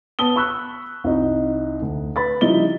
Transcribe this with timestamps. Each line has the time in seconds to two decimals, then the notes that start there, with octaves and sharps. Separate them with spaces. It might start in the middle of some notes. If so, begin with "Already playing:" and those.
0.19 B3 B4 A5 D#6 G7
0.36 B5 C#6 E6 F#6
1.04 C2 D#4
1.82 D2
2.16 B4 B5 A6
2.41 C#3 F3 G3 D#4 E4 G7